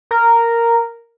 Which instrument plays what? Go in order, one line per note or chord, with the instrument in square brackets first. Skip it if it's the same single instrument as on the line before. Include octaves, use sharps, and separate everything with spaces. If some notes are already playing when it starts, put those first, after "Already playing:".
[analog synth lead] A#4